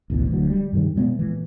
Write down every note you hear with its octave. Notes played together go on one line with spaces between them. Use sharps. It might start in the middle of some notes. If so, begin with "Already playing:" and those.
A1 D2 B2 E3
D1 D2 F#3
G3
G2 C3 D#3 G3
B2 G#3 A#3 B3
A#2 E3